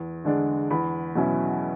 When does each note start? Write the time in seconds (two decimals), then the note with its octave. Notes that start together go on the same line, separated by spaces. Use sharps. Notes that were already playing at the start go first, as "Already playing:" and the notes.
Already playing: E2
0.24 D3 G#3 D4
0.71 E2 B5
1.15 B2 F#3 C#4 E4